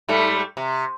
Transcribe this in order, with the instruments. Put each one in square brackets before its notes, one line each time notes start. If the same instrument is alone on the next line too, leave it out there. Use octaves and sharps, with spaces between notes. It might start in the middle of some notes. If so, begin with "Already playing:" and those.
[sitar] G#2 G3 A3
C3